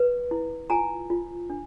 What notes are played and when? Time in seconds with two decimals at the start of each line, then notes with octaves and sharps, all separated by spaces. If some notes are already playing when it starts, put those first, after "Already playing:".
Already playing: B4
0.31 E4
0.70 F4 G#5 A#5
1.10 F4
1.50 D4